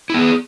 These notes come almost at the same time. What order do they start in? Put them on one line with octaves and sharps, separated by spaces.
E4 B3 G#4